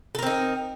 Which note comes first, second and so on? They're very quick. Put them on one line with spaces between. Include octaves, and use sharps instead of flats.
A4 A#4 C4 D#4